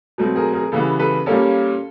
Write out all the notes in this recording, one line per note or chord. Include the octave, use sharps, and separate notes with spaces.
B2 F#3 A3 C4
G#4 A#4
G#4 A#4
C#3 E3 G3 B3 A4
A4 B4
A#2 G3 A#3 C#4 A4